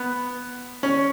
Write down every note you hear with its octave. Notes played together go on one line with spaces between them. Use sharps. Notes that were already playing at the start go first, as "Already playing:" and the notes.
Already playing: B3
C#4